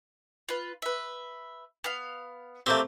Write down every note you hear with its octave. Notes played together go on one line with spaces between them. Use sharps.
F4 B4
B4 E5
B3 F5
A3 A#3 C4 G4 G6